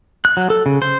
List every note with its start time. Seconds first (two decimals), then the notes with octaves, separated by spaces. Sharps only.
0.25 F#6
0.37 F#3
0.50 A4
0.66 C#3
0.82 C5